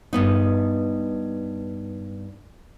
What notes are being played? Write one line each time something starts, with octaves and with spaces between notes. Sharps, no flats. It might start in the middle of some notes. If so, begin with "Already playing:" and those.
G2 B3 D#4